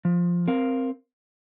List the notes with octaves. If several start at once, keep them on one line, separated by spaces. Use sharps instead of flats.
F3
C4 A#4 F5